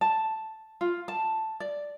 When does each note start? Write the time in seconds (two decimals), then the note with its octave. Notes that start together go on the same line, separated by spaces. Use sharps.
0.01 A5
0.81 F4
1.08 A5
1.60 D5